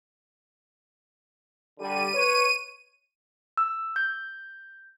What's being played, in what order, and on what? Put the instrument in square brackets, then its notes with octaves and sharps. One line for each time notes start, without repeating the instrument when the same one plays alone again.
[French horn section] D3 G3 [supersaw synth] D#7
[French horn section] B4 C#5
[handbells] E6
G6